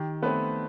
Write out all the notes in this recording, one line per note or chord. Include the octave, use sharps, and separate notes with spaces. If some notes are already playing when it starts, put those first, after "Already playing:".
Already playing: D#3 G4
A3 B3 C4 B4